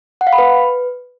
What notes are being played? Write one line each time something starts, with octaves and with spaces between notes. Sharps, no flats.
F#5
F5
B5
B4